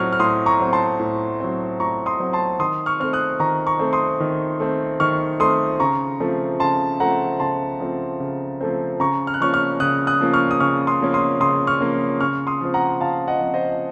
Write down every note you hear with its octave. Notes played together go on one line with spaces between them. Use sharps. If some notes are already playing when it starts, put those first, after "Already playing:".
Already playing: A2 F#3 C4 C#6 F6
F6
A2 C6 D#6
A#5 C#6
F#3 C4
A5 C6
A2
F#3 C4
A2 A#5 C#6
C6 D#6
F#3 C4
A5 C6
D#3 C6 D#6
C#6 F6
A3 C4 F6
D#6 F#6
D#3 A#5 C#6
A#5 C#6
A3 C4
C6 D#6
D#3
A3 C4
D#3 C#6 F6
A3 C4 C6 D#6
C#3 A#5 C#6
F3 A3 C4
C#3 A5 C6
F3 A3 C4 F#5 A#5
C#3 A5 C6
F3 A3 C4
C#3
F3 A3 C4
C#3 A#5 C#6
F6
F#6
F3 A#3 C#4 C#6 F6
C#6 F6
C#3 D#6 F#6
D#6 F#6
F3 A#3 C#4
C#6 F6
D#6
C#3 C#6 F6
C6 D#6
F3 A#3 C#4
C6 D#6
C#3 C6 D#6
C#6 F6
F3 A#3 C#4
C#3 C#6 F6
C6 D#6
F3 C4
F#5 A#5
C#3 F5 A5
D#5 F#5
F3 C4
C5 D#5